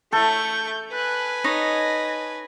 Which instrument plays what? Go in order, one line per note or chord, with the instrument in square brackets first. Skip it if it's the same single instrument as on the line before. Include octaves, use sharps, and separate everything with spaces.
[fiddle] A3 C#6 [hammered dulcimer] A4 [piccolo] G6
[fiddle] B4 G#5 [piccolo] F#6
[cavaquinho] D#4 C#5 D#5 [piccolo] A#6